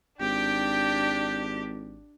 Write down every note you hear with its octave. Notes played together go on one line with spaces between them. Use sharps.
G#1 D4 G4 G5